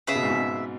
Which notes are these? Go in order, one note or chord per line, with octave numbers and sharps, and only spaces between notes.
C#3 B3 G#4 E5
B2
G#2
B2